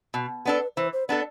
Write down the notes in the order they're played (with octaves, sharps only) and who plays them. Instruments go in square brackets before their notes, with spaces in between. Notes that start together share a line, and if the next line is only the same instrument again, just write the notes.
[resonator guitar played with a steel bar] B2
[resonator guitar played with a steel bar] B3 D4 A4 [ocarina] B4
[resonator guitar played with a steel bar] E3 [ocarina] C5
[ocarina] C5
[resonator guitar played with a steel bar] B3 D4 A4 [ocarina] D5